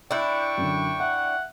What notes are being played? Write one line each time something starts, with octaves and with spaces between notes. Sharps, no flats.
D4 E4 G5 C#6 E6 F#6 G6
F#2 D3
E5 F#5